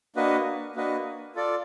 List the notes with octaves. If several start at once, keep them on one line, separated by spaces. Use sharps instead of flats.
A#3 D4 F#4 B4 D#5
A#3 D4 F#4 B4 D#5
F4 A4 D5